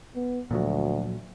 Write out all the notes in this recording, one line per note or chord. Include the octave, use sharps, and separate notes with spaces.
B3
D2 A#2 F3 F#3